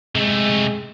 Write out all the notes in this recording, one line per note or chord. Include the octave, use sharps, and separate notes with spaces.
C3 G#3 A3